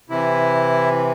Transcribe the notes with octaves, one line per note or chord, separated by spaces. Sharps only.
C3 E3 E4